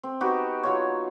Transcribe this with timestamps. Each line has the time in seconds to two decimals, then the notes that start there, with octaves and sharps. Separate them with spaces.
0.03 C4
0.21 B3 D#4 F#4 G4
0.63 F#3 F4 C#5